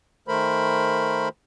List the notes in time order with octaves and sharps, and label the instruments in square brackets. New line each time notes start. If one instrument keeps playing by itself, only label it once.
[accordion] D#3 A3 A#4 C5 B5